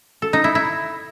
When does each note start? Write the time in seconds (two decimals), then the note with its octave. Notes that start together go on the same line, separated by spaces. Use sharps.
0.22 A4
0.33 D#4
0.44 E4
0.55 E4